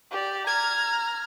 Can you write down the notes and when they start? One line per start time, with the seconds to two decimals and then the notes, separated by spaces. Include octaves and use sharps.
0.11 G4 D5
0.46 A#5 F6 G#6